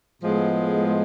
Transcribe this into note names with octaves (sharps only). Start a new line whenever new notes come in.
A2 F3 G#3 B3